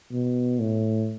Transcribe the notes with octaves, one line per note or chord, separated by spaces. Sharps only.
B2
A2